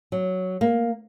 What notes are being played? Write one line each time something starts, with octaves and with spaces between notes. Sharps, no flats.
F#3
A#3